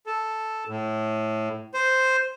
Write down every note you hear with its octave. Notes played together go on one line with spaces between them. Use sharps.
A4
A2
C5